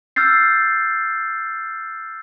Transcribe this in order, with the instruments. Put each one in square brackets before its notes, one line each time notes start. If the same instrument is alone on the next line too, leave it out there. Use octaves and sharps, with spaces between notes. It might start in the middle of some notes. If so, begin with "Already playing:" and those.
[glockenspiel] E6 F6 G6 A6 C7